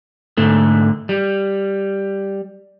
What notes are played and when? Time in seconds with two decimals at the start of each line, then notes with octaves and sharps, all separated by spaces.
0.37 G#2 D3 A3
1.09 G3